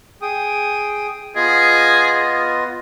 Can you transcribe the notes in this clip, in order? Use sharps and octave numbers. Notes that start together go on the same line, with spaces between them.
G#4 G5 D#6
B3 F4 G#4 D#5